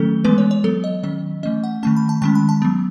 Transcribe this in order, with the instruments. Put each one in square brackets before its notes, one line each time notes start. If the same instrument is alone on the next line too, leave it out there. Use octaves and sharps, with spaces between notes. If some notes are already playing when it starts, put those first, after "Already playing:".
Already playing: [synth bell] D#3 F#3 A3 C#4 A4
E3 G#3 B3 B4
C#5
C#5
F#3 B3 A4
D#5
D#3 F#3 C#4 D#5
E3 A3 C#4 D#5
F#5
D#3 A3 C#4 A5
B5
A5
D#3 G#3 C#4 A5
B5
A5
F#3 B3